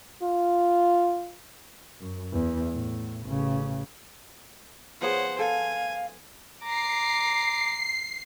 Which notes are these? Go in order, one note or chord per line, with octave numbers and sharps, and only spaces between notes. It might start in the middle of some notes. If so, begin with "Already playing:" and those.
F4
F#2
E2
A2
A1 C#3
F3 B3 G#4 C5 C#5 F#5
A4 F5 G#5
A#5 D6 C7